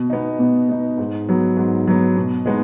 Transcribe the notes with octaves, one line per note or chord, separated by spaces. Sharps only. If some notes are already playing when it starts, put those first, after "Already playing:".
Already playing: B2
B3 D#4
B2
B3 D#4
G#2
F#3 B3
G#2
F#3 B3
B2
G#3 B3 D#4